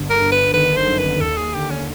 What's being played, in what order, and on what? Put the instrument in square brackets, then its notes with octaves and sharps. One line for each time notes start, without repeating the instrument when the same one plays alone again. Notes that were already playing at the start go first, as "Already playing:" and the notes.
Already playing: [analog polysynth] G1 D3
[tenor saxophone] A#4
[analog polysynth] G1
[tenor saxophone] B4
[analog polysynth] D#3 [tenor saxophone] B4
[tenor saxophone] C5
[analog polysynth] F#2
[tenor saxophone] B4
[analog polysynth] D#2 [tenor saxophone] A4
[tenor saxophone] G#4
[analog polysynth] D3 [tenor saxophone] G4
[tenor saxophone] C#4